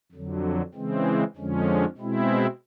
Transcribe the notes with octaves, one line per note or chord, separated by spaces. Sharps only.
F2 D3 F#3
C#3 E3 G#3 C4
F2 D3 F3 G#3 C#4
B2 G#3 C4 E4